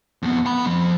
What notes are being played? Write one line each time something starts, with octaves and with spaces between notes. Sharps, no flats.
F2 B3
F#5 B5
F3 C4